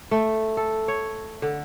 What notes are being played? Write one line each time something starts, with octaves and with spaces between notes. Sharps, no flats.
A3
A4
C#5
D3